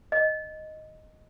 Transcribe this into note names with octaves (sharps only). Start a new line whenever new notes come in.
D#5